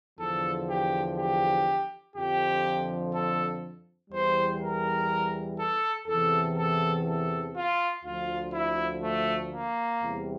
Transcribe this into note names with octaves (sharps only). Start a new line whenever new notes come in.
E2 D3 F3 A4
G4
G4
F2 D3 F3 G4
A4
E2 E3 G3 C5
A#4
A4
E2 C3 E3 A4
A4
A4
F4
D2 D3 F3 F4
E4
A3
A#3
E2 C3 G3